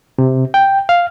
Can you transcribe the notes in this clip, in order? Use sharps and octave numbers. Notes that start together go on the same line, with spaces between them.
C3
G5
F5